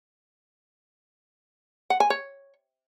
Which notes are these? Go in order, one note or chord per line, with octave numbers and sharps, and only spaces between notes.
F#5
G#5
C#5